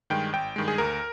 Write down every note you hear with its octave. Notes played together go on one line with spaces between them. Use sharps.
G2 D#3 G#3 G5
G#1 G5
G2 D#3 G#3
G#4
D2 A#4